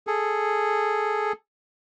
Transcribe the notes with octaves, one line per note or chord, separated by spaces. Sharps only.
G#4 A4